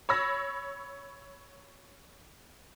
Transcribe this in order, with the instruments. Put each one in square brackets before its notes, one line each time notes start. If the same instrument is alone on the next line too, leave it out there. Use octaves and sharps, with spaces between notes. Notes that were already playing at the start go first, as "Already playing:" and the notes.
[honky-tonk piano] C#5 B5 E6 A#6